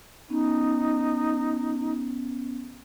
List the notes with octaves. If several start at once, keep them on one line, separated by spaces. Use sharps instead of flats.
B3 C#4 D#4